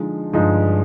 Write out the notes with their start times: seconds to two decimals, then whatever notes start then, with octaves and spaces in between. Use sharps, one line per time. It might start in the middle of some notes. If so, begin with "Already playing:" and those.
Already playing: D3 F3 G#3 D#4
0.33 G2 D3 F3 G#3 D#4